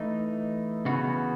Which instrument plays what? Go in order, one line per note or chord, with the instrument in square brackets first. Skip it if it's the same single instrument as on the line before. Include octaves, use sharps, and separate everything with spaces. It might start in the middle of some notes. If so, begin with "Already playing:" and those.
Already playing: [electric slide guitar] E3 A3 D#4
C#3 E3 B3 F#4